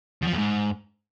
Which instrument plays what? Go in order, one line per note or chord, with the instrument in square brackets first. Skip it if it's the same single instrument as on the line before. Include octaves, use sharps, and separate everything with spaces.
[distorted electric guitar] E2
F3
E2
G#2